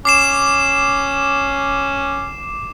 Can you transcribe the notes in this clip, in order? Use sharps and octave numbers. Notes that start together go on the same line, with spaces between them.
C#4 D6 C7 E7